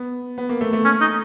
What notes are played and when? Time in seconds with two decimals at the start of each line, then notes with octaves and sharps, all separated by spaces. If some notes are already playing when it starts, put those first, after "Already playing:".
Already playing: B3
0.38 B3
0.49 A#3
0.61 A3
0.73 A3
0.85 C#4
1.01 D#4